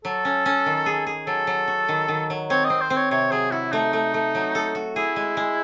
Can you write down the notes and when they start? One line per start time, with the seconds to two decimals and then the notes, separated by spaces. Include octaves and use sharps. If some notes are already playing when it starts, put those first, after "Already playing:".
0.05 F#3 A4
0.25 C#4
0.46 C#4
0.66 D#3
0.86 G#4
1.07 G#4
1.27 F#3 A4
1.47 F#3
1.68 F#4
1.89 D#3
2.08 D#3
2.30 F#3
2.50 C4 C#5
2.65 D#5
2.70 C4
2.81 C5
2.90 C4
2.97 C#5
3.11 C3 C#5
3.31 F#3 G#4
3.52 E4 F#4
3.72 A3 D#4
3.93 A3
4.14 A3
4.35 F#3
4.55 A4
4.75 F#4
4.96 E4 G#4
5.16 G#3
5.37 G#3